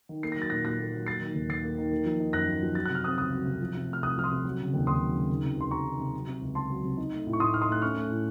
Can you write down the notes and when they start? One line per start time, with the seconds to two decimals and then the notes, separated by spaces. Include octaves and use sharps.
0.09 D#3
0.23 A#3 C7
0.32 F#3 A#6
0.42 A6
0.50 A#2 F#6 A#6
0.64 A#2 F#6 A#6
0.78 A#3
0.94 F#3
1.06 A#3 A6 C7
1.21 D#3
1.35 D#2
1.49 D#2 A6 C7
1.64 A#3
1.78 D#3
1.92 A#3
2.05 F3
2.20 D#4
2.33 F#2 F#6 A#6
2.48 A#3
2.62 F3
2.75 F#3 A6
2.86 C3 F#6
2.95 F6
3.04 C4 D#6 F#6
3.18 C#2 D#6 F#6
3.32 F#3
3.46 C3
3.61 F3
3.75 C3
3.89 A3 F6
4.02 C2 D#6 F#6
4.17 F3 F6
4.24 C6 D#6
4.31 C3
4.45 F#3
4.59 C#3
4.74 D#2
4.87 D#2 C6 D#6
5.01 F#3
5.16 C#3
5.29 D#3
5.43 C3
5.57 C#2 C6
5.71 C#2 A#5 C#6
5.85 D#3
5.99 C3
6.13 F#3
6.27 C3
6.42 C#2
6.55 C#2 A5 C6
6.70 F#3
6.84 C3
6.97 D#4
7.12 A3
7.27 A2
7.33 C#6
7.40 A2 C6 D#6
7.54 D#4 F6
7.61 C6 D#6
7.69 A3 F#6
7.82 C#4 C#6 F6
7.96 A3
8.10 A2